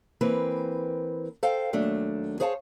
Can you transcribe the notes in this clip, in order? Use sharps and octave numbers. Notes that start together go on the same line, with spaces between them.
E3 A#3 C4 B4
A4 C5 F5 G5
D#2 F#3 A3 D4
G#4 C5 C#5 F5 G#5 A5